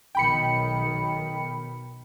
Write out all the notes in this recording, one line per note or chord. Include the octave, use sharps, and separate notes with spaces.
B1 D#3 G5 B5 C#7